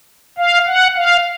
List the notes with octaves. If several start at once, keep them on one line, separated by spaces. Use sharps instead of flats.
F5
F#5
F5